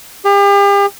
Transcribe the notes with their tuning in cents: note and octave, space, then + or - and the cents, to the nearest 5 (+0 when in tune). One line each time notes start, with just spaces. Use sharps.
G4 +40